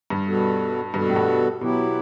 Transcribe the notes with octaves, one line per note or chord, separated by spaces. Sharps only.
G2
B2 G3 B3 F#4 A4
G2 B2 G3 B3 F#4 A4
A2
G2
B2 F#3 B3 E4 G4